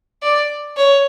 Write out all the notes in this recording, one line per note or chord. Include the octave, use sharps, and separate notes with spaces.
D5
C#5